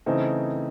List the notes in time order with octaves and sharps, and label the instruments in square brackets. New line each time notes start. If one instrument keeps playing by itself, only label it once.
[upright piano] C#3 E3 A3 C4 D#4